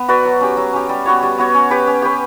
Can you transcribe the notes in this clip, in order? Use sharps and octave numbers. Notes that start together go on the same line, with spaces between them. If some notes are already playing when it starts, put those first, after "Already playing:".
Already playing: B3
F#4 B4 D5
F#3
C#4 G4
F#3
C#4 G4
G3
B3 F#4 C#5
G3
B3 F#4 C#5
C#4
G4 B4
C#4
G4 B4